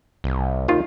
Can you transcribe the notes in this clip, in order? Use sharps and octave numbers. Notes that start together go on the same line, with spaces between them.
C2
D#2 D#3 F4